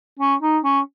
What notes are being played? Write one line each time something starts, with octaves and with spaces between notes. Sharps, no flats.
C#4
D#4
C#4